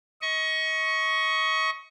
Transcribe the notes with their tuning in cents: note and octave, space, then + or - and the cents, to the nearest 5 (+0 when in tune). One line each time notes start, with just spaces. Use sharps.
D#5 +30 C#6 +0